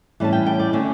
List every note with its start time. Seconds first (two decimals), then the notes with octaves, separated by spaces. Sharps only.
0.20 A2 E3 G3 C#4 A5
0.33 G5
0.46 G5
0.59 D5
0.73 D3 A3 C#4 C#5